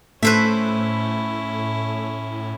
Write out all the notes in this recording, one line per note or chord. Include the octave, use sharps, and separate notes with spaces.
A2 A3 C#4 E4 B4 C5 E5